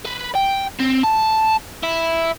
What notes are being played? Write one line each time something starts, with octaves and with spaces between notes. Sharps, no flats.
B4
G5
C4
A5
E4